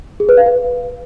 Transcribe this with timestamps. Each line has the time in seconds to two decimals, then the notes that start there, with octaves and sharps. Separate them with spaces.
0.20 G#4
0.29 B4
0.37 F5
0.46 B4